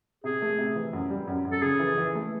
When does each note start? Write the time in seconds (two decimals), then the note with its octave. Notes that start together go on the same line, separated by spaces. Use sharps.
0.24 C3 G#4
0.42 A3
0.58 C3
0.75 E3
0.93 F#2
1.10 G3
1.27 F#2
1.45 F#2
1.52 A4
1.62 C#3 G#4
1.79 E3
1.98 E3
2.15 A3